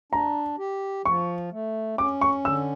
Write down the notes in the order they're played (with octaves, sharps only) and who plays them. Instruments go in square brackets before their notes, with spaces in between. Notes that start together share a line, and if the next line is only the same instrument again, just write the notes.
[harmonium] D4 [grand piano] A#5
[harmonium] G4
[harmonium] F3 [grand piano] C#6
[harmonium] A3
[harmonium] C#4 [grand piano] D6
[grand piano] C#6
[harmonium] D3 [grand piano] E6